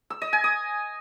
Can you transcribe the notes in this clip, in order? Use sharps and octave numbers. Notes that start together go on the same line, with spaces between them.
E6
D#5
G#5
D#6